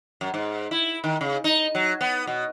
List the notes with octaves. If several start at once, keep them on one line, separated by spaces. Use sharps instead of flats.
F#2
G#2
E4
D#3
C#3
D#4
F#3
B3
B2